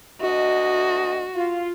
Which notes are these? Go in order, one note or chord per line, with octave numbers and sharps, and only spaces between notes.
D2 F#4 D#5
F4